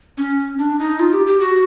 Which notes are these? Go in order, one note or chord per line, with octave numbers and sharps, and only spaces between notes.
C#4
D4
D#4
F4
G4
G4
F#4